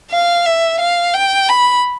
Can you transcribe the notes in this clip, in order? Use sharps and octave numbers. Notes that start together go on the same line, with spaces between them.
F5
E5
F5
G5
B5